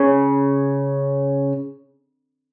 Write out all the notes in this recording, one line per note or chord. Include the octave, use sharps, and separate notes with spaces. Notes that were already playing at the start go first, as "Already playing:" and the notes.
Already playing: C#3